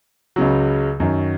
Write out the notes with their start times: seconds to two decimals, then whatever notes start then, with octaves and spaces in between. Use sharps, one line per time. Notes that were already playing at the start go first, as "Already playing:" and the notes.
0.36 C#2 C#3 F#3
1.00 F#2 D#3 F#3